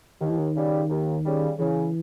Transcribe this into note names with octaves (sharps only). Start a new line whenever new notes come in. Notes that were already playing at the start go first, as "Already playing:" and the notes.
D#2 D#3
E3
D#3
C#3 G3
D#2
C#3 G3
C#3 E3